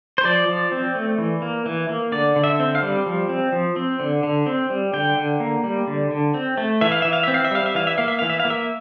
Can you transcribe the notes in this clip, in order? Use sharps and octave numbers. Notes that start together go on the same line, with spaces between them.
C5
F3 D5
F3
C4
A3
E3
A#3
E3
A#3
D3 D5
D3
E5
C4
F5
G3
F3
C4
F3
C4
D3
D3
C4
G3
D3 G5
D3
A#3
G3
D3
D3
C4
A3
E3 E5
F5
E3 E5
F5
C4 E5
F5
E5
G3 F5
E5
E3 F5
E5
A#3 F5
E5
E3 F5
E5
F5
A#3
E5